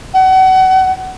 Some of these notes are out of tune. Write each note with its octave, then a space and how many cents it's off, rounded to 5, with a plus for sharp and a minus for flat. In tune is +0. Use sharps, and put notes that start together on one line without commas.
F#5 +30